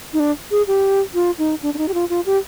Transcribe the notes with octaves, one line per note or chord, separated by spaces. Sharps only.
D#4
D4
G#4
G4
F4
D#4
D4
D4
D#4
G4
F4
F4
G4